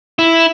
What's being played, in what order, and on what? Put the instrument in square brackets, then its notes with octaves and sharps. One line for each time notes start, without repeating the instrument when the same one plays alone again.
[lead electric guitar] E4